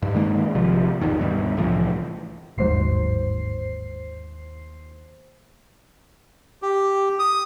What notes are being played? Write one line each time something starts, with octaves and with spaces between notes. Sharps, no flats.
G2
D#3 G#3 A#3
A#1 C3 F3
G1 E2 D#3
D2 G2 B2
C2 A2 E3 F3
G1 D#2 G#2 F#3 C5 C7
G4
D#6